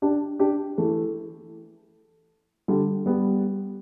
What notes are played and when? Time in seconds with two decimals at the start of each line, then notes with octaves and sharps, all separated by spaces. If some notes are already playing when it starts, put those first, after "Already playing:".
0.02 D4 G4
0.40 D4 G4
0.78 E3 A3
2.68 D3 G3
3.06 G3 B3